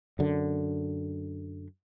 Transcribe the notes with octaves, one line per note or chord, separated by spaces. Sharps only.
F#2 D3